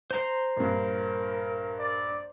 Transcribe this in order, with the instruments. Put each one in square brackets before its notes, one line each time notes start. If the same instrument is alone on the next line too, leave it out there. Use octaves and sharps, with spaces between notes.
[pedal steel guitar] C5 A#5 C6
[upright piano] A#1 G2 [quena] A#4
[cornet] D5